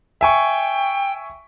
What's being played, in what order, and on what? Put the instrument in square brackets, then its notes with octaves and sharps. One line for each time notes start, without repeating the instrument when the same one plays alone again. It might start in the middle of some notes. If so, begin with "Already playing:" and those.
[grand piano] E5 G#5 C#6 [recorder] G5